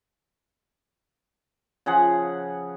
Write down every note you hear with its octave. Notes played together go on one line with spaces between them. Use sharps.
C#3 F3 G#4 F#5